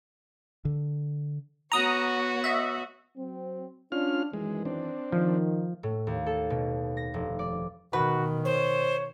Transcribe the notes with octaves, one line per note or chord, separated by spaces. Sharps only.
D3
B3 F#4 C#5 A#5 D#6
D#5 E5
F#3 C4
C#4 D4 F4 F6
F#2 D#3 E3 G#3
C4 D4
D#3 F3
A2
D#2
A4
B2
A#6
F1
D5
B2 D#3 F#4 B4
C5 C#5